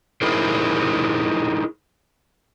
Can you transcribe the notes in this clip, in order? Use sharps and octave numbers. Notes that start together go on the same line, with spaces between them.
D#4 E4 G#4 A#4 C5